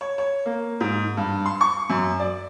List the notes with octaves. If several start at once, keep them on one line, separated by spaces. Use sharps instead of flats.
C#5
C#5
A#3
G#2
G2
C6
C#6
F#2
D5